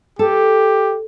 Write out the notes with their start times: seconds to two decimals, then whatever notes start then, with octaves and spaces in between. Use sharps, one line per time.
0.19 G4 A4